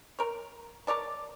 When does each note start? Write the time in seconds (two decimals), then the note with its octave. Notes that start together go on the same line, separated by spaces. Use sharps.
0.19 A#4 C#5
0.87 A#4 C#5 D5 A5